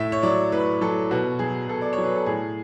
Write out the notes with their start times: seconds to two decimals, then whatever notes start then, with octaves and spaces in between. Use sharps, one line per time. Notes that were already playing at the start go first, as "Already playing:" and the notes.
Already playing: A2 E5
0.12 C#5
0.23 F#3 D5
0.52 A2 B4
0.81 F#3 A4
1.11 B2 F#4
1.39 F#3 G#4
1.68 B2 A4
1.81 D5
1.93 C#5
1.98 F#3
2.04 B4
2.15 A4
2.26 A2 G#4